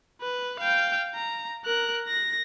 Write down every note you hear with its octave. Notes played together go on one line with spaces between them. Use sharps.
B4
F5 G5
A#5
A#4 F#6
A#6